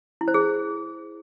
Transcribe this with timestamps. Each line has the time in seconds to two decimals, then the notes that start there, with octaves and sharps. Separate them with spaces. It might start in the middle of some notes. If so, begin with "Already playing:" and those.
0.21 E4
0.28 C5
0.34 G#4